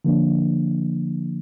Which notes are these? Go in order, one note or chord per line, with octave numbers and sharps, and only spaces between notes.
D3 F3 A#3 D4